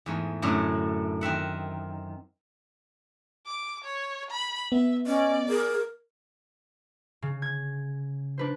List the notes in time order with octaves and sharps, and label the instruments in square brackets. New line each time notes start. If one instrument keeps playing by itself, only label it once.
[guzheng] E2 G#2 A3
F#2 A2 D3 D4 E4
D#3 C4 E5 F#5
[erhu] D6
C#5
B5
[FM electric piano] B3 [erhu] E5
[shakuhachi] C#4 [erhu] D5 [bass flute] D#5
[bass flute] G#4 [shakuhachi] A#4
[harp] C#3
G#6
D4 B4 C5